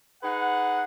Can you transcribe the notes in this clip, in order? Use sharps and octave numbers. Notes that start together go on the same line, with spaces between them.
D#4 G#4 B4 F#5